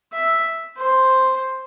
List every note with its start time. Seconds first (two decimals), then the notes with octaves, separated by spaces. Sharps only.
0.13 E5
0.78 C5